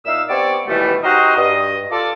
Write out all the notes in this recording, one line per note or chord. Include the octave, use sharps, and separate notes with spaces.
A#2 D#4 E5 F5 E6
B3 C4 G4 C#5 D5
D#2 B2 E3 G3 A3
D#4 F#4 G4 A#4 C5 D#5
G2 D#5
F4 A4 D5